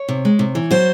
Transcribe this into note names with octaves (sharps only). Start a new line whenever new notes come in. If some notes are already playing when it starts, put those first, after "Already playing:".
Already playing: C#5
C3
G#3
C3
E3
F#3 C5